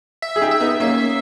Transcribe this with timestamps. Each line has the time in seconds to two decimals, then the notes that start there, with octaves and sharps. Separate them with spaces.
0.22 E5
0.36 G#4
0.42 D#4 G4
0.51 E5
0.60 B3 D#4
0.80 A#3 C#4 E5